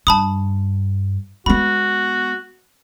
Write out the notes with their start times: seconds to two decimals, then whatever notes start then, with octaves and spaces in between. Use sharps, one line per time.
0.07 G2 A5 B5 D#6
1.46 G#3 B3 F#4 B5